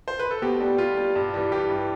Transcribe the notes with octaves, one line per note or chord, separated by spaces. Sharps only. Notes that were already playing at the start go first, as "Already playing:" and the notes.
C5
B4
A4
B2 G4
G3
B2 F4
G3
G2
E3 G3
G2 G4
E3 G3